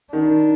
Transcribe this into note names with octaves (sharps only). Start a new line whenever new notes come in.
D#3 D4